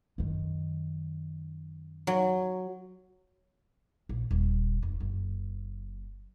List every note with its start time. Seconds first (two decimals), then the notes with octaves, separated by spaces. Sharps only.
0.18 F#2 D#3
2.07 F#3
4.09 A#1
4.31 D#1
4.82 F1
5.00 F#1